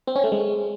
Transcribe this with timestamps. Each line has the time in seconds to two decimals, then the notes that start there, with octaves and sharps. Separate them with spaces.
0.07 C4
0.16 C#4
0.24 A3
0.32 G#3